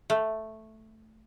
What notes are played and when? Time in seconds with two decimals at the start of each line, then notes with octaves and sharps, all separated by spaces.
0.10 A3